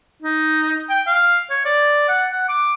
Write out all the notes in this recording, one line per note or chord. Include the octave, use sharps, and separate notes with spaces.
D#4
G5
F5
C#5
D5
F#5
F#5
D6